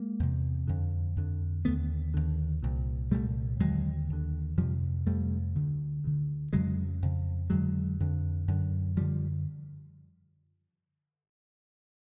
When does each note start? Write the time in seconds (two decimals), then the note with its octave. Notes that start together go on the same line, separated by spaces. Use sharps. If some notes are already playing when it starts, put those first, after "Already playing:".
Already playing: G#3 A#3
0.19 E2 C3
0.68 F2 D3
1.16 F2 D3
1.65 D#2 D3 A3 B3
2.14 D#2 D3
2.63 C2 A#2
3.11 C2 A#2 G3 A3
3.60 D#2 D3 F#3 G#3
4.09 D#2 D3
4.57 F2 C3 F3 G3
5.06 F2 C3 G3 A3
5.55 D2 D3
6.04 D2 D3
6.53 F2 C#3 F#3 G#3
7.02 F2 C#3
7.50 F2 D3 F#3 G#3
8.00 F2 D3
8.48 F#2 D3
8.96 F#2 D3 F3 G3